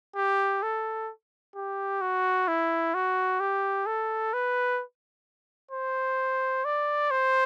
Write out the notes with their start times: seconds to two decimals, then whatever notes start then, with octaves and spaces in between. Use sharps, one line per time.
0.16 G4
0.62 A4
1.55 G4
2.01 F#4
2.48 E4
2.94 F#4
3.40 G4
3.86 A4
4.33 B4
5.71 C5
6.65 D5
7.11 C5